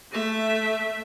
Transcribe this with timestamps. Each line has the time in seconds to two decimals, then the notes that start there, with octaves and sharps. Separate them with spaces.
0.11 A3 E5